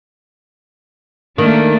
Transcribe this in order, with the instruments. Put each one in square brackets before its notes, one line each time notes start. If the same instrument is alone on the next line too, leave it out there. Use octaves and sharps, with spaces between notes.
[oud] D#3 [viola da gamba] A3 A#3 D4